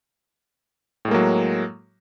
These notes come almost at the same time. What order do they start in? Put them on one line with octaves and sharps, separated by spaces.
A2 G#3 A#3 F#3